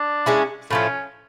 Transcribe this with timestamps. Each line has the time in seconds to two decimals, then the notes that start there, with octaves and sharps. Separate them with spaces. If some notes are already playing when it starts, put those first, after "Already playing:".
Already playing: D4
0.26 G#3 C#4 E4
0.71 A2 F3 A3 C#4